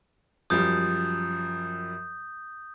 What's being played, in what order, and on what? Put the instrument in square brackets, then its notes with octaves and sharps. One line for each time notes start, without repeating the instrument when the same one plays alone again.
[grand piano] F#2 F3 G3 [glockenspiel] D#6 G6